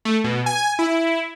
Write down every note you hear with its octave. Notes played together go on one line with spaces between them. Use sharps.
A3
B2
G#5
E4